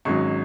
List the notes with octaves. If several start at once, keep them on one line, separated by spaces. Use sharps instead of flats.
G#1 G#2 F#3 C#4 C#6